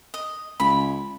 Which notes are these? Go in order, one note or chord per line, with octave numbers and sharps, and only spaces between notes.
D#5
C#2 B5